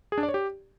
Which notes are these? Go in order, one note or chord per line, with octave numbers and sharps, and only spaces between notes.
G#4
D4
D5
C#5
G4